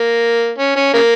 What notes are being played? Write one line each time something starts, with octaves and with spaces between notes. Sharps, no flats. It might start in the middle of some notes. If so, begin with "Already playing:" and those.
Already playing: A#3
C#4
C#4
C#3 A#3